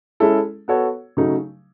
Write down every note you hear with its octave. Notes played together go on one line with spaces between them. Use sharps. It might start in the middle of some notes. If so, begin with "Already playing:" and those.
G#3 C#4 E4 A4
B3 F#4 A4 C#5
C#3 F#3 A3 D#4